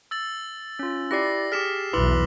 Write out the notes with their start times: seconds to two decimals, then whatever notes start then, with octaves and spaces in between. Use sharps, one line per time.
0.11 E6 A6 F#7
0.79 C#4 F4
1.11 E4 G4 D5 A#6 C7
1.52 G4 G#4 F6 B6 E7
1.93 B1 E2 E4 B4 C6 D6 E6 F#7